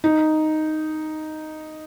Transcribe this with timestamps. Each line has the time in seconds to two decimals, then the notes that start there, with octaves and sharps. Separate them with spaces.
0.04 D#4